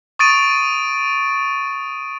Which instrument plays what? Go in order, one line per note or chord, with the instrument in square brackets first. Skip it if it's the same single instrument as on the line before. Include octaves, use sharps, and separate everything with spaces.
[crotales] C#6 D#6 A6 D7 D#7